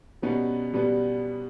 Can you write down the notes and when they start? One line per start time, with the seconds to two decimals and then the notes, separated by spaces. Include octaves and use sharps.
0.22 B2 G3 B3 C#4 D#4
0.73 B2 G3 B3